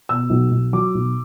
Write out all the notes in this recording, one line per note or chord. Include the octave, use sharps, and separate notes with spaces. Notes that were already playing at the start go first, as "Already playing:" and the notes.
B2 E6
B1
B1
F#3 D6
B1